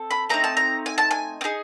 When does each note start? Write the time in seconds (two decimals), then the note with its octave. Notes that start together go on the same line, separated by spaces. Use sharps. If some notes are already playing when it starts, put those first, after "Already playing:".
Already playing: C4 A4
0.11 B5
0.29 A3 C4 D#4 A#5
0.44 A5
0.57 A#5
0.86 G#5
0.98 A5
1.11 G#5
1.41 C4
1.44 D#4 G#4